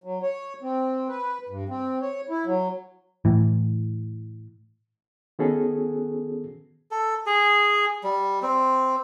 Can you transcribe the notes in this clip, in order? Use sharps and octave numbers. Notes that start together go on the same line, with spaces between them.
F#3
C#5
C4
B4
G2
C4
C#5
E4
F#3
A2 E3
D#3 B3 C#4 F#4 G#4 A4
A4
G#4
G3
C4